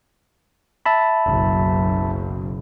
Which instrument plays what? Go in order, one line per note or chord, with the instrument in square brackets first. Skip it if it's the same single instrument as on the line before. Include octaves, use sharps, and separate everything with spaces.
[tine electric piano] E5 A5 B5
[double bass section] F#1 B1